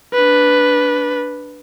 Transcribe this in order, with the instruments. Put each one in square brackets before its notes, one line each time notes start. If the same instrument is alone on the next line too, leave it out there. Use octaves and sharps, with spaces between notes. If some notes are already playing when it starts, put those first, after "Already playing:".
[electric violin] D4 B4